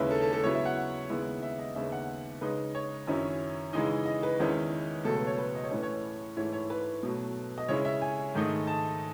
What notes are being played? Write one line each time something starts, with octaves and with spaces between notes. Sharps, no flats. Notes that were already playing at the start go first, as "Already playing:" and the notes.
Already playing: D#2 C#3 G#3 C#4 E4 B4 E5
A4
A4
A4
C#3 F#3 B3 E4 C#5
E5
F#5
D#2 C#3 G#3 B3 E4
E5
D#5
D#2 C#3 G#3 B3 E5
F#5
C#3 G#3 D#4 B4
C#5
F#2 D#3 F#3 C#4 E4
C#3 E3 G#3 D#4
D#5
B4
E2 D#3 G#3 C#4 E4
C#2 B2 F#3 A3 A4
B4
C#5
B4
D#5
C#5
A2 E3 A3 C#4 B4
C#5
G#2 E3 A3 E4 C#5
C#5
B4
B2 F#3 A3
D#5
C#3 G#3 C#4 E4 C#5
E5
G#5
G#2 D#3 A3 D#4
A5